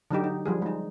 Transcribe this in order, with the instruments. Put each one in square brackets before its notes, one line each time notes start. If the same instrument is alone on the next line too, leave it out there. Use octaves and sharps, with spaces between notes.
[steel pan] D3 F#3 D#4 G4
D#4
F3 G3 G#4
G#3 D#4